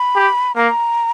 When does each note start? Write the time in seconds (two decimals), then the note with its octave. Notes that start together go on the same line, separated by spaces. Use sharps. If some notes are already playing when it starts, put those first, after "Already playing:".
Already playing: B5
0.16 G4
0.55 A#3 A#5